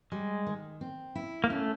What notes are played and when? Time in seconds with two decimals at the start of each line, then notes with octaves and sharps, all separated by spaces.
0.12 G3 G#3
0.46 D#3
0.81 C4
1.15 E4
1.44 A#3
1.50 A3 C#4